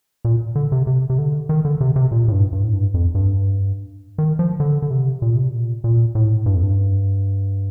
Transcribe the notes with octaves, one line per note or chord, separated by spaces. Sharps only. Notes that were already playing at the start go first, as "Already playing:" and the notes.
A#2
D3
C3
C3
C3
D3
D#3
D3
C3
C3
A#2
A2
G2
G2
A2
G2
F2
G2
D#3
F3
D3
D3
C3
A#2
C3
A#2
A#2
A2
G2
F2
G2